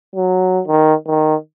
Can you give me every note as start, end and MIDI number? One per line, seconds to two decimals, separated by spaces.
0.15 0.62 54
0.67 0.94 51
1.07 1.35 51